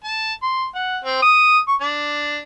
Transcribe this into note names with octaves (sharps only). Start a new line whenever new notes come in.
A5
C6
F#5
C4
D#6
C#6
D4